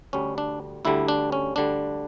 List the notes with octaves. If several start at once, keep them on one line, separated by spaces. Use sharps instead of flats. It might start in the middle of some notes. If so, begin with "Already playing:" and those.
D2 D3 G3 C#4
D4
D2 D3 G3 E4
D4
C#4
D2 D3 G3 D4